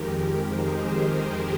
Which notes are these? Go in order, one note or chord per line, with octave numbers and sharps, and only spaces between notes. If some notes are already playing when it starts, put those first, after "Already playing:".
Already playing: F2 D#3 G#3 G4 A#4
G#4 C5